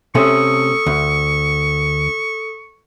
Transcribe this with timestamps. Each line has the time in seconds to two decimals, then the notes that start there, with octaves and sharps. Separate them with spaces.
0.15 C3 A3 C#4 A4 C#6 D#6 E6
0.86 D2